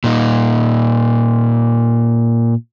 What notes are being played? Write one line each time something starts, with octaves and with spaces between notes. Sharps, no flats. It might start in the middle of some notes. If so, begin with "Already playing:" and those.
A#2 D#4